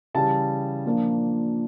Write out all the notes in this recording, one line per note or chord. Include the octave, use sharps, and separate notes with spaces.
C#3 E3 G3 A5
A#2 F3 A#3 D4